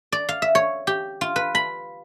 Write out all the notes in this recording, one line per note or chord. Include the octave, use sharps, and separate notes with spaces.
D5
F5
E5
C#5
G4
F4
B4
B5